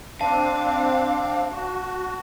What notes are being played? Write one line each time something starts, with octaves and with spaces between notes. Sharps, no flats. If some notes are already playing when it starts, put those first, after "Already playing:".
C4 D4 F5 A5
F#4